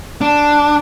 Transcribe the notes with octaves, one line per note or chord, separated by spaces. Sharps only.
D4